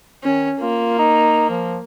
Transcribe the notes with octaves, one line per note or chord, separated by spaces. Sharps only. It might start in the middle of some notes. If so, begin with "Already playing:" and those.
D#3 C#4
A#3 F4
D#4
F3